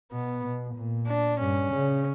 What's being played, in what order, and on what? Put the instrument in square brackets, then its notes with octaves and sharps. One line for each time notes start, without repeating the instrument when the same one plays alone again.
[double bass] B2 [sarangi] B3
[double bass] B2
A#2
[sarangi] D4
[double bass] G2 [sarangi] C#4
[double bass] C#3